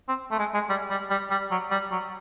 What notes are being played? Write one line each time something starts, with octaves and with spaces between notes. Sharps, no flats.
C4
A3
G#3
G#3
G3
G3
G3
G3
F#3
G3
F#3